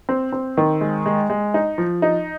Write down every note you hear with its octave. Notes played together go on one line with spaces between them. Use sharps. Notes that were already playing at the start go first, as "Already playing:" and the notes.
C4
C4
D#3
G#3
G#3
G#3
D#4
F3
D#4